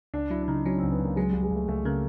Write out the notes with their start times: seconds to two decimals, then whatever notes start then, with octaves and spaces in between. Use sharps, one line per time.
0.14 C#2 D4
0.30 F#3 E4
0.43 D4
0.48 C#3 D#4
0.65 F#3 C#4
0.78 C4
0.83 C#2
0.91 B3
1.00 C#2 A#3
1.16 F#3 G#3
1.30 C#2 G3
1.43 G#3
1.51 C#2 A3
1.68 C#2 A3
1.85 C#3 A#3